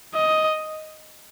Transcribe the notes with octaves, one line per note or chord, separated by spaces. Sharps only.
D#5